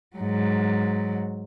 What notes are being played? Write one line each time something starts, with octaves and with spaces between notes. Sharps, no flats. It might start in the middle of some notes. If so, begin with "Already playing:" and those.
G#2 F#3